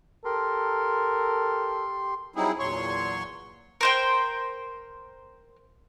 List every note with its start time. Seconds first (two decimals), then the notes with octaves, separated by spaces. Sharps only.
0.25 G4 A4 A#4 C6
2.36 F#3 G3 C4 D#4 E4 G#4
2.59 E2 A#2 F#3 C#5 C6 C#6
3.81 A#4 C5 G5